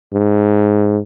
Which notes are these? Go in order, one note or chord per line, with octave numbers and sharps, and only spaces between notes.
G#2